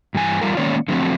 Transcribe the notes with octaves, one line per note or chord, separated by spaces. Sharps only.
G2 E3 G#5
E2 G3 F4 A#4
D#3 G#3 A#3 C#4 C#5 D5
D3 F3 F#3 A3 C4